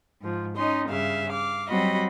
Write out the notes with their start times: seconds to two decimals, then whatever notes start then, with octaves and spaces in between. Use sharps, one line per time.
0.22 G#2 F3
0.56 C#4 D#4 D#5 C6
0.89 G2 C#3 E5 F5
1.29 F5 D6
1.70 F#3 G3 C4 F#4 D#5 B5